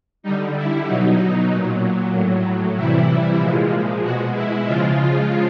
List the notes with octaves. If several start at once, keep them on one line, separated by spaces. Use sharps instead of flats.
D3 G3 D#4
E4
B2 F#3 D#4
A#2 F#3
A2 F#3
C3 E3 G3 E4
A#2 F3 G#3
B2 G#3 F#4
E4
C#3 F3 G#3 F4